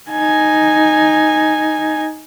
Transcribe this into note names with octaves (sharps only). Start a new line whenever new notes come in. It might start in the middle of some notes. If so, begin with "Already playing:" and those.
D#4 G#5